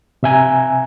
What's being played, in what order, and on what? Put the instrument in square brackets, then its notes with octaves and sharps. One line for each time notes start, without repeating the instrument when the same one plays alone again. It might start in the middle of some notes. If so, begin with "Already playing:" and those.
[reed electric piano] C3 E5 G#5 A#5